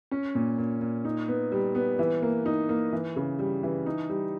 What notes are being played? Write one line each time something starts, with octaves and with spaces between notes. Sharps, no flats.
C#4
A#2
A#2
A#2
D#4
B3
G3
B3
E3
A#3
D#4
A#3
E3
C#3
G3
E3
D#4
G3